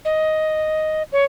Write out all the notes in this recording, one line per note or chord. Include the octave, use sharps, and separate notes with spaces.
D#5
C#5